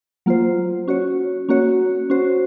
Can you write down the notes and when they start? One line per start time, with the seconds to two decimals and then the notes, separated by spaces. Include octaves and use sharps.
0.26 F#3 A#3 F4 C5
0.88 C#4 F#4 C#5
1.49 A#3 C#4 F#4 C#5
2.10 C#4 F#4 C5